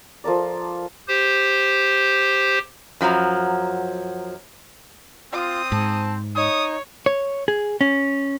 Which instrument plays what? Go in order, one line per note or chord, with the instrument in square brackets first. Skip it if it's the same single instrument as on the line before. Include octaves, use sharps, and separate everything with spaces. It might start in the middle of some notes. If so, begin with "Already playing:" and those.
[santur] F3 A4 A#4 D5
[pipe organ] G4 C5
[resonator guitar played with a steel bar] F#2 F3 F#3 A#5
[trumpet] C4 [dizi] F4 [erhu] D#6
[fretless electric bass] G#2 [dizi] A5
[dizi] D#4 [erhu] C#5 [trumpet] D#6
[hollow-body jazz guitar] C#5
G#4
C#4